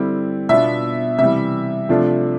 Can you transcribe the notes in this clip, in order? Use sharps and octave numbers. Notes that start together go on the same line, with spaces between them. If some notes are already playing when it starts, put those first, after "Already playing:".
Already playing: D3 G3 C4 E4
B2 B3 D4 F4 E5
C3 E3 G3 E5
C3 F3 A3 D4 F4